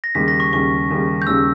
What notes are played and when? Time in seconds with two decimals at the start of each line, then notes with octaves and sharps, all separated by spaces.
0.04 A#6
0.15 D#2 C#3 G3 B6
0.28 A#6
0.40 C#6
0.52 D#2 C#3 G3 C#6
0.90 D#2 C#3 G3
1.22 G6
1.27 D#2 C#3 G3 E6